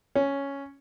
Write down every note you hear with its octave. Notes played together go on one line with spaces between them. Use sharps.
C#4